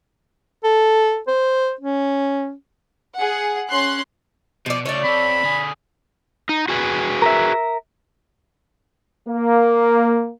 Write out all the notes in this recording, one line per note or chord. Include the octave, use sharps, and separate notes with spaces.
A4
C5
C#4
G#4 F#5
C#4 C6 F#6
B2 F3 D5
C#3 A3 C#5 D5
C4 A4 B5
D3 G#4
D#4
F#4 G#4 B4
A#4 E5
A#3